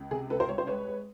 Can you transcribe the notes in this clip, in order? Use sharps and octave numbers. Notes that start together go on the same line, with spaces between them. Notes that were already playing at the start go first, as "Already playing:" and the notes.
Already playing: C#2
C3 G#4
C#2 A4 B4
A#4 C5
C2 C#5
C5
G#3 B4 C#5
G#3